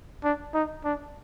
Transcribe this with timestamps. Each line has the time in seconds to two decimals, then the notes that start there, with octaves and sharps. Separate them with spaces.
0.24 D4
0.54 D#4
0.84 D4